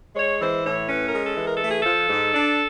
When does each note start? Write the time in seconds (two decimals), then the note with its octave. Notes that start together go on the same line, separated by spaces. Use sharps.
0.15 G#3 C#5
0.40 E3 C5
0.64 A2 C#5
0.88 C#4 B4
1.07 A#4
1.12 G#3
1.24 A4
1.37 E3
1.44 A#4
1.55 A4
1.61 A3
1.68 G#4
1.81 F3 A4
2.09 G#2
2.34 D4